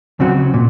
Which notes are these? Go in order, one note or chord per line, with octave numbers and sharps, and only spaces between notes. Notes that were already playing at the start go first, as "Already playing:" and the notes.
C#3 F#3 C4 F#4
A#2